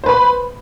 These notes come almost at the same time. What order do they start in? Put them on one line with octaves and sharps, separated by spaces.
C5 B4 B5